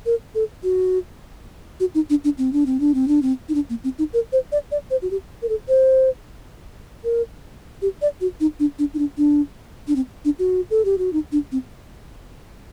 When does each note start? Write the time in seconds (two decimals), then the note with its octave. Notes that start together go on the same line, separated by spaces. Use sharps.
0.06 A#4
0.35 A4
0.63 F#4
1.80 F#4
1.95 D#4
2.10 D4
2.24 D4
2.38 C4
2.53 D4
2.66 C4
2.80 D4
2.94 C4
3.08 D4
3.22 C4
3.49 D#4
3.54 D4
3.70 A#3
3.84 C4
3.98 D#4
4.13 A#4
4.32 C5
4.52 D5
4.72 D5
4.90 C5
5.02 F#4
5.11 G4
5.42 A#4
5.49 A4
5.68 C5
7.04 A#4
7.82 G4
8.02 D5
8.21 F#4
8.40 D#4
8.59 D4
8.79 D4
8.94 D#4
8.99 D4
9.18 D4
9.88 D4
9.96 C4
10.25 D4
10.39 F#4
10.70 A4
10.85 G4
10.98 F#4
11.13 D#4
11.32 D4
11.52 C4